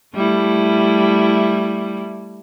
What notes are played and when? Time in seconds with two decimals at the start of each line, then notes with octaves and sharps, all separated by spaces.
0.15 G3 A3 E4